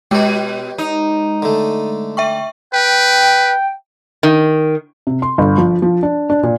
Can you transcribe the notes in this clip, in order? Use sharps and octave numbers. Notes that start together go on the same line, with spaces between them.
B2 G#3 G4 B4
D#4
D3 A3
E5 G5 C#6
B4 G5
D#3
C3
C6
G1
F3
F3
D4
D4
A#2